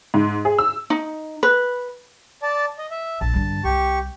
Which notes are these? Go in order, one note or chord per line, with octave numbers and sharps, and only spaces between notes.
G#2
G#4
E6
D#4
B4
D5 A5
D#5
E5
A#1 A5
G2 D3
C2 G4 C#6